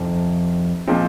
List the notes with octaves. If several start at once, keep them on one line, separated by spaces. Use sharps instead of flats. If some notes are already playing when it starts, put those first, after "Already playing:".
Already playing: F2 C3 D#3
A#2 F3 G#3 C4